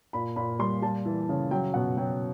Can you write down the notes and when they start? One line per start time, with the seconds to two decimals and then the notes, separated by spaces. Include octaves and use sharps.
0.13 A#2 B5
0.36 A#2 B5
0.59 G3 C6
0.82 G3 A5
1.05 E3
1.29 C#3
1.51 F#3 G5
1.74 B2 F#5
1.97 F#3 G5